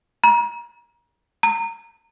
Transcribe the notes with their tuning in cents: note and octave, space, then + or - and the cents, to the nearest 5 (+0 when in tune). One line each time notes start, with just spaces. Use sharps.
A#5 +35
A#5 -25